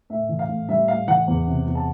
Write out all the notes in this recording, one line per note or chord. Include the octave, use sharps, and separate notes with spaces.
A2 E5
E3
F5
A2
G3 E5
A2 F5
E3 F#5
E2
C3
E2
A5